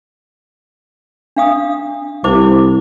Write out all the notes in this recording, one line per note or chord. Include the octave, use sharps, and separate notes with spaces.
D4 F5 D#6
C2 E4 C5 D6